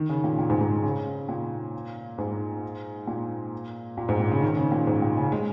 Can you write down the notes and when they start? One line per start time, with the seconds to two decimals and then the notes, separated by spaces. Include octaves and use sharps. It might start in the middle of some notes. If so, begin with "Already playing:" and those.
Already playing: D#3
0.09 C#3
0.24 A#2
0.39 A#2
0.50 G#2
0.61 G#2
0.84 C#3
1.29 A#2
2.18 G#2
3.07 A#2
3.98 A#2
4.09 G#2
4.20 A#2
4.31 C#3
4.42 D#3
4.57 C#3
4.72 A#2
4.87 G#2
5.02 A#2
5.17 C#3
5.32 G#3